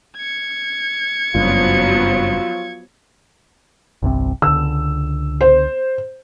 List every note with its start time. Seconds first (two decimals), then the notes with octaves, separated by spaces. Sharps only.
0.17 G#6 C#7
1.35 F#1 G2 F3 F#3 B3 F4
4.03 G1 C2 C3
4.42 C#2 D3 E6
5.41 C5